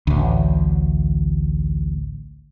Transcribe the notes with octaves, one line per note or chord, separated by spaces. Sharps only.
A1 D2